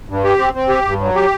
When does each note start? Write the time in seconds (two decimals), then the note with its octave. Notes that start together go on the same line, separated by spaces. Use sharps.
0.09 G2
0.24 G4
0.38 C4
0.55 C4
0.69 G4
0.85 G2
1.01 F#3
1.15 G4